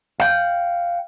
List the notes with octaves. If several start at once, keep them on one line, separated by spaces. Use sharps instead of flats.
F5 G5